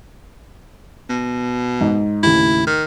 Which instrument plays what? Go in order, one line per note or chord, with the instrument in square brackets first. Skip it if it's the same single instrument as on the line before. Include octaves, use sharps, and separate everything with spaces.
[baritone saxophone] B2
[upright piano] G#2 D#4
[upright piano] D#2 A2 C#3 [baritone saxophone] E4
[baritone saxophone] D#3